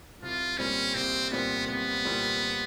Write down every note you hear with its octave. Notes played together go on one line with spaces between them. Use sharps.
C2 F4
A#2 G3 C4 C#4
C2 C4
A#2 G3 B3 C4
C2 B3
A#2 G3 C4